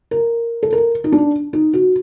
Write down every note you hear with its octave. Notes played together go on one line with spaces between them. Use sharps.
A#4
A4
A#4
D#4
D4
D#4
F#4